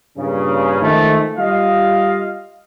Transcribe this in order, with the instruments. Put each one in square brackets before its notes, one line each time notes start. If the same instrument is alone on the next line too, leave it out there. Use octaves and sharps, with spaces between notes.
[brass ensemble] G2 A#2 C#3
D#3 F3 G#3 A3
G3 F4 D#5 F5